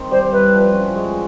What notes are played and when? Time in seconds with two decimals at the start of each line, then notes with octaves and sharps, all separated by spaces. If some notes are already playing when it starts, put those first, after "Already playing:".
Already playing: D#3 C4
0.11 G3 C5
0.32 E4 B4
0.54 F3
0.74 C#4
0.96 G#3